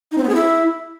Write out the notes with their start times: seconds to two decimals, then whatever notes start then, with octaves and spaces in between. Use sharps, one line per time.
0.12 D#4
0.18 C4
0.23 B3
0.29 G#4
0.35 E4